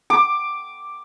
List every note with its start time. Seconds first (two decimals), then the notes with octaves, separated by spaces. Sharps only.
0.10 D6